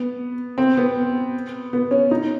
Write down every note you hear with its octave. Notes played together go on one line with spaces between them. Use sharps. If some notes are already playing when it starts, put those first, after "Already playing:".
Already playing: B3
C4
B3
B3
C#4
D#4